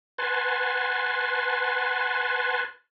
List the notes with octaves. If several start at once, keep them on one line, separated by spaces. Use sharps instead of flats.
B4 F#5 G#5 A5 C6